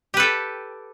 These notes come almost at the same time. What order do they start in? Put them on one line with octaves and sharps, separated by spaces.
G4 B4 A4 G5